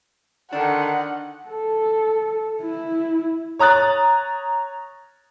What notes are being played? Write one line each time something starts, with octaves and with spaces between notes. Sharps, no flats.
D3 D#3 D4 A4 F#5
A4
E4
C#5 A#5 D#6 F#6 A6